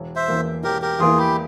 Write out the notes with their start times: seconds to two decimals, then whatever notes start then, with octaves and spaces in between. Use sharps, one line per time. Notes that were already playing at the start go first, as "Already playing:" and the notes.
Already playing: E1
0.16 C5 E5
0.28 E2 E3 A#3
0.63 E1 G4 A#4
0.82 G4 A#4
0.99 E2 E3 A#3 F4 G#4
1.18 E4 G4